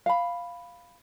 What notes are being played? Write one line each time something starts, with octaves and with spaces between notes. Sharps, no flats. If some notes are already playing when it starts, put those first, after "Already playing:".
F5 B5